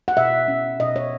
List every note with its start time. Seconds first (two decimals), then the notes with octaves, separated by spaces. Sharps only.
0.08 F#5
0.17 B2 E5
0.48 C#4
0.80 B2 D#5
0.96 C#5